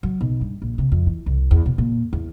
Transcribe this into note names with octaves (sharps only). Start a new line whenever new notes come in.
F#3
B1
G2
A#1
C3
F2
E3
C2
E2
B2
A#2
E2